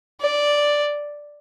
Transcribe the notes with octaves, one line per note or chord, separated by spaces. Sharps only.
D5